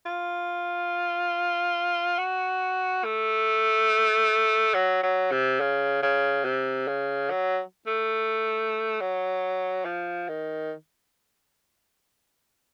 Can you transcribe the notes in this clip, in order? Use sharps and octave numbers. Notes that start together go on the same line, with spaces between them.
F4
F#4
A3
F#3
F#3
C3
C#3
C#3
C3
C#3
F#3
A3
F#3
F3
D#3